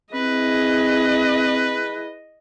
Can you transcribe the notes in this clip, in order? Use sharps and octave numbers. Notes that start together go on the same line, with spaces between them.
C4 E4 G#4 B4 D#5